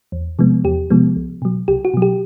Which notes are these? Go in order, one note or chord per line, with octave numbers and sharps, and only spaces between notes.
E2
C3 F3 G#3 B3
E2 G4
C3 F3 G#3 B3
C2
B2 F#3
C2 G4
F#4
B2 F#3
G4